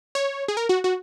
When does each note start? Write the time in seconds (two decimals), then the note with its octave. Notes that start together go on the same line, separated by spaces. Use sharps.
0.15 C#5
0.48 G#4
0.57 A#4
0.69 F#4
0.84 F#4